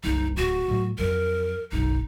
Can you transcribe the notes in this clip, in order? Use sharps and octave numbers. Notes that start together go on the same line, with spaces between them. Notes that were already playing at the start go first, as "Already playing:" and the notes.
F#1 C2 D#4
D1 F#4
A2 F#3
F2 F#3 A#4
F#1 B1 D#4